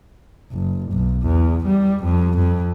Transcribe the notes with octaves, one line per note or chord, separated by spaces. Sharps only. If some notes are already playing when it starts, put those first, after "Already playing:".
F#1
B1
E2
G3
F2
F2